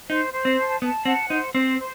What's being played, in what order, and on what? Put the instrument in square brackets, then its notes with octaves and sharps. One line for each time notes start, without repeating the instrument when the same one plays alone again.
[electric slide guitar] D#4 [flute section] C5
[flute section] C5
[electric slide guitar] C4
[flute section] A5
[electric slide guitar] B3 [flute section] A5
[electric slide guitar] C4 [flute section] F#5
[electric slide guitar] D#4 [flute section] C5
[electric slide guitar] C4 [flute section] C5
[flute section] C5